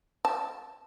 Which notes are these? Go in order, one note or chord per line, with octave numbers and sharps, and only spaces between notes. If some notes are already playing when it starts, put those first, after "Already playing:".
A5